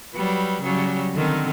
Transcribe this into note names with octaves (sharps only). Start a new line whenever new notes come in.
F#3 G3 B4
C#3 F#3 G3
D3 D#3 C4